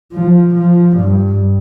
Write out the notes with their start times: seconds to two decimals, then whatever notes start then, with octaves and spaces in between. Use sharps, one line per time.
0.13 F3
0.55 F3
0.97 G2